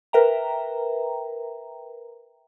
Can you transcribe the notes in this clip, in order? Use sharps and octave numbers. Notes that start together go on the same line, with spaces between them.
A#4 B4 E5 G5 A#5